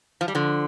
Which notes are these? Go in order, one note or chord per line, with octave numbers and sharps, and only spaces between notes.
F3
G3
D3 F3